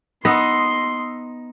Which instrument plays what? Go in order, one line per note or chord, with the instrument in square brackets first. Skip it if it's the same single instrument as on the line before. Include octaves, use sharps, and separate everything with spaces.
[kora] B3 [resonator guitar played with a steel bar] D#4 [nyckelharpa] C6 [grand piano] D#6 E6 A#6